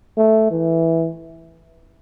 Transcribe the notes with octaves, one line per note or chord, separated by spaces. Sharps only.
A3
E3